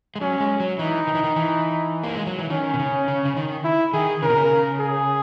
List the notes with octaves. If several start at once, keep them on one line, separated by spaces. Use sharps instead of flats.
G#3
F#3 C#4
G#3
F#3
E3 D#4
D#3
E3
D#3
E3
A#3
G#3
F#3
E3
D#3 C#4
B2
C#3
C#3
C#3
D#3
E4
D#3 G#4
C#3 A#4
B2
C#3
G#4